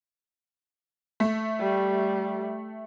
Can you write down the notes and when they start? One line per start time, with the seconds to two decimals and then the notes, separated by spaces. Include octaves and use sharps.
1.20 A3
1.60 G3